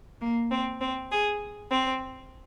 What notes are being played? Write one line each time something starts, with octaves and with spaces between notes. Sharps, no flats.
A#3
C4
C4
G#4
C4